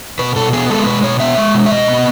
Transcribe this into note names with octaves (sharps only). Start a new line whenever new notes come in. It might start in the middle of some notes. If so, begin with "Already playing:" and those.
B2 B4
B2 A4
B3 G#4
G#3 A4
B2 B4
B2 C#5
B3 E5
G#3
B2
E5
B2 D#5
B3